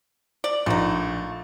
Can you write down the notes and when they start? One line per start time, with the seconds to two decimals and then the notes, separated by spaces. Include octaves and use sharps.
0.44 D5
0.66 A#1 A3 D#4